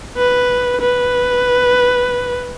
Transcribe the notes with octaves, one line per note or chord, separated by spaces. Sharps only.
B4
B4